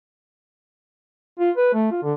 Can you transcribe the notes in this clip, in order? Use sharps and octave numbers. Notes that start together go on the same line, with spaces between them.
F4
B4
A3
F4
D3